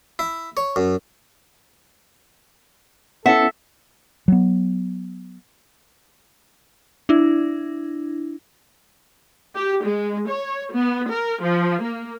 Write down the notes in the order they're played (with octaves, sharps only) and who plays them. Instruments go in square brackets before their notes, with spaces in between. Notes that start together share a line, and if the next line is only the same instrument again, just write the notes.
[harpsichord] E4
C#5
F#2
[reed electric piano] B3 C#4 E4 [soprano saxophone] A4 [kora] E5 [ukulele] F#5
[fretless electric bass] F#3 B3
[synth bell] D4 E4
[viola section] G4
G#3
C#5
B3
A#4
F3
A#3